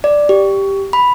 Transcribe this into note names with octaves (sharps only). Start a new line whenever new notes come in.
D5
G4
B5